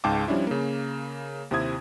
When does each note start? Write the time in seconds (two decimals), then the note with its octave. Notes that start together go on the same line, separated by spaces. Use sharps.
0.04 C#2 G#2 F5 G5 A5 D6
0.28 F3 G3 C#4 D4 E4
0.47 C#3 A#3
1.51 D#2 C3 C4 E4 D#6 G#6